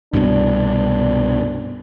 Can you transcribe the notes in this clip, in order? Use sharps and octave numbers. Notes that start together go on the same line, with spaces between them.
C2 G2 B2 D4